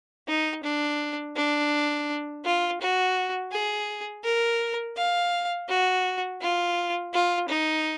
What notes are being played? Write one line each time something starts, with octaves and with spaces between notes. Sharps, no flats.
D#4
D4
D4
F4
F#4
G#4
A#4
F5
F#4
F4
F4
D#4